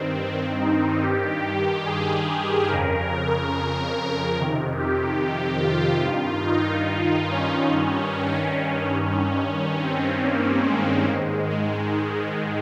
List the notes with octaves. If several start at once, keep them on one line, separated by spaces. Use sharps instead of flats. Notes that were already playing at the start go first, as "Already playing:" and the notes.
Already playing: G2 D#3 C4
D#4
G2 D#3 G4
G#4
F2 C#3 A#4
A#4
F2 C3 D#3
G4
F4
G2 D#3
D#4
C#4
G2 D#3
C#4
G2 D#3
C4
A#3
G#3
G#2 D#3
G#3